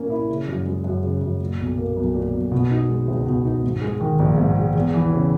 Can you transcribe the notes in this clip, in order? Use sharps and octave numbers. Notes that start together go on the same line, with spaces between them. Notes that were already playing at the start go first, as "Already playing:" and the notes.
Already playing: A#2 A#3 C#4
E4
C#3
F#2
G#3
F#2
C#3
F#2
A#2
B1
A#3
B1
A#2
B1
B2
D#4
G#3
C#2
B2
D#4
G#2
G#3
D#3
A#1
G#2
G#3
E2
E3
C#3